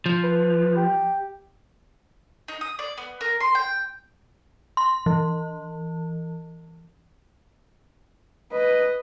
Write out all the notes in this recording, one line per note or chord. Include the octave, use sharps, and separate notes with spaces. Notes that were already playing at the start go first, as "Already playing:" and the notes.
F3
B4
G4
D#4
D#6
D5
B3
A#4
C6
G5
C6
E3
B4 D#5